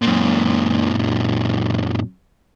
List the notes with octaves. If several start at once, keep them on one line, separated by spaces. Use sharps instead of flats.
F#2 A#2